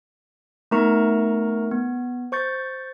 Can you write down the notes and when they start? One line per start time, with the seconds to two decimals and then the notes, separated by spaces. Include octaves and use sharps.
0.71 A3 B3 D#4 A#4 A#5 C#6
1.71 B3
2.32 C5 C#6 G6 A6